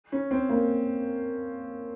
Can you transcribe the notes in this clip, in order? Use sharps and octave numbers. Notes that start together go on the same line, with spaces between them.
C#4
C4
A#3